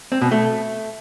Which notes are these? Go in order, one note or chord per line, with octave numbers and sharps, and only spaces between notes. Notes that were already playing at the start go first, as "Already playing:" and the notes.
C4
B2
A3